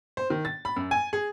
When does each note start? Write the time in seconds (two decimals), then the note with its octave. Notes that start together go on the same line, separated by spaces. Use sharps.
0.17 C5
0.30 D#3
0.45 A6
0.65 B5
0.76 F#2
0.91 G#5
1.13 G#4